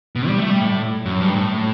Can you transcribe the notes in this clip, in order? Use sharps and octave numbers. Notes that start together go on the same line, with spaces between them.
B2
G3
A3
G3
A2
F#2
G2
A2